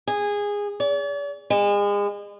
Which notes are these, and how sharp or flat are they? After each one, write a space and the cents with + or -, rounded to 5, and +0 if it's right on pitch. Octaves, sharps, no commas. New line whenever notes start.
G#4 -15
D5 -45
G#3 -35